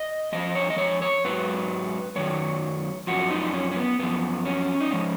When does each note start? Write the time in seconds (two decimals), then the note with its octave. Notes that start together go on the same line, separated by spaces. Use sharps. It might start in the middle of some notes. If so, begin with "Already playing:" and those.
Already playing: D#5
0.32 F2 F3 D#5
0.55 C#5
0.70 D#5
0.78 C#5
1.02 C#5
1.25 G#2 F#3 B4
2.16 F#2 D#3 F#3 C#5
3.07 F#2 F3 F#4
3.30 D#4
3.54 C#4
3.71 C#4
3.76 B3
3.99 F#2 F3 B3
4.45 C#4
4.80 D#4
4.91 G#2 F3 C#4